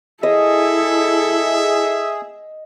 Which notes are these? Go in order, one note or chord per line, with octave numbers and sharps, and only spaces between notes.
E4 G#4 A4 D#5 E5